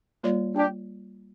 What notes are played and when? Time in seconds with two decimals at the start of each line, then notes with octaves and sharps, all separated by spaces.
0.23 G3 A#3 F4 D5
0.55 D4 G4